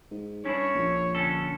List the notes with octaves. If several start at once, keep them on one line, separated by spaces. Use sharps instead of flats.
G#2
G2 C#4 D4 E4 C#5
A#1
D3 C#4 A4